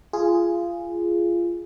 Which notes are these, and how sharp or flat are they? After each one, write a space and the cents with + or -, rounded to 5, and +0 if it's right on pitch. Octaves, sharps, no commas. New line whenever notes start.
F4 -20 G#4 +0